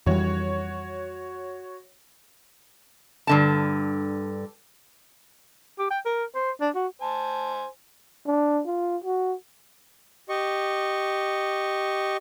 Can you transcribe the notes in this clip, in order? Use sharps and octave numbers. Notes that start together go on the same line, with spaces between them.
F2 E3 G3 F#4 C#5
G2 D3 A5
G4
G5
A#4
C5
D4
F#4
C5 G#5 A5
D4
F4
F#4
G4 D#5 C#6